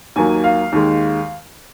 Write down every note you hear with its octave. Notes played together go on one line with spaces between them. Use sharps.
D#2 D#3 F#3 A#3 G#5
F5
D#2 D#3 G#3